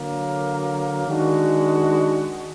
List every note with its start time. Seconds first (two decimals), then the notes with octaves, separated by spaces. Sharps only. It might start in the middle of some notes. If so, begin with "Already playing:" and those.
Already playing: D3 F#3 A#3
1.07 D#3 G#3 D4 F#4